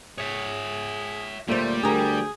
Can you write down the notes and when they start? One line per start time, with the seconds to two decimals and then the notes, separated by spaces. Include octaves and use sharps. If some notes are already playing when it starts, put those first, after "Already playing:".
0.18 G#4 C#5 E5
1.48 D2 A#2 G3 A3 C5
1.83 D2 G4 G#4 A#4